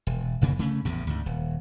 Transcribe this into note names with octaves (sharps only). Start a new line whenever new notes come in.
E1
F1 F2 C#3 A#3
C#3 A3 C#4
A1 E2 A2 C#3
D2 G#2
D#1